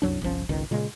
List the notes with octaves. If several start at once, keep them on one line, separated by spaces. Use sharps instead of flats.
C2 F#2 F#3 D4
G1 C2 F3 C#4
G#1 C#2 D#3
A#2 C#3 G#3